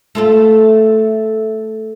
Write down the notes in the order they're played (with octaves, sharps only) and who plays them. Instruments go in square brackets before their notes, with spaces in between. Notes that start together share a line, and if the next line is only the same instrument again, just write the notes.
[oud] A3 F4 A4